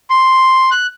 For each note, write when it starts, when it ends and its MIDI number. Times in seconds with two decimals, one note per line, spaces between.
0.10 0.70 84
0.71 0.86 90